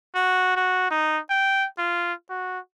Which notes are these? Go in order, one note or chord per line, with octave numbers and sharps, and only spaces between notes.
F#4
F#4
D#4
G5
F4
F#4